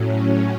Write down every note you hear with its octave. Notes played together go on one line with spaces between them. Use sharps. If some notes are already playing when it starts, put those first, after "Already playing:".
Already playing: A2 F#3 C#4